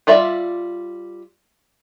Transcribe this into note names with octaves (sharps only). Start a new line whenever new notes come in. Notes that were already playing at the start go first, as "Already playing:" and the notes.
G3 F4 D5 E5